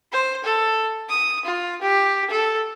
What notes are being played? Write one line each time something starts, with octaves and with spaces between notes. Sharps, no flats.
C5
A4
D#6
F4
G4
A4